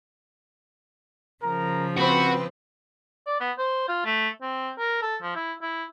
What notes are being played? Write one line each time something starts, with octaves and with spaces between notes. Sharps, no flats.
C#3 F3 A#4 A#5
C4 F#4 B4 B5
D5
B3
C5
F4
A3
C4
A#4
A4
F3
E4
E4